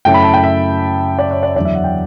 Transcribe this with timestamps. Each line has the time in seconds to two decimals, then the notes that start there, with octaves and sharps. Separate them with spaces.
0.05 F#2 C#3 F#3 A3 E4 G5
0.14 B5
0.24 A5
0.34 G5
0.44 E5
1.19 D5
1.31 C#5
1.43 D5
1.56 E2 D3 F#3 D5
1.65 E5
1.75 F#5
1.84 G5